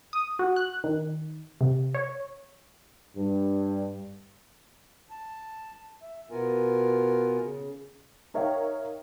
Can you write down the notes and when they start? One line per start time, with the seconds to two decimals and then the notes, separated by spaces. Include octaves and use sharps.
0.13 D#6
0.39 F#4
0.56 F#6
0.84 D#3
1.61 C3
1.94 C#5
3.16 G2
5.10 A5
6.02 E5
6.31 B2 B3 F4 A#4 G#5
7.41 C#3
8.34 D#4 A#4 C#5 E5 F5 G5